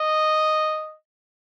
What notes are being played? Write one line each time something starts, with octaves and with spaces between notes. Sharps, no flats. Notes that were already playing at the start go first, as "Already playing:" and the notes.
Already playing: D#5